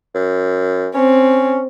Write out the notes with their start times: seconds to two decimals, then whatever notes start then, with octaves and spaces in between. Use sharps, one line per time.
0.15 F#2
0.95 C4 C#4